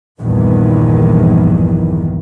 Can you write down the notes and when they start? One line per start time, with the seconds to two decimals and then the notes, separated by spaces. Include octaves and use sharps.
0.21 A#1 E2 G2 D#3 E3